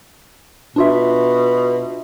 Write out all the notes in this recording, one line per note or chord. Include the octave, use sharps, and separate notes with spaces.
B2 D4 F4 E5